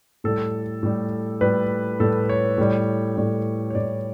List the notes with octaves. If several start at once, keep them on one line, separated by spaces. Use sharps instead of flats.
A2 G3 A4
A2 G3
A2 G3 B4
A2 G3 A4
C#5
A2 G3
A2 G3
C#5
A2 G3 D5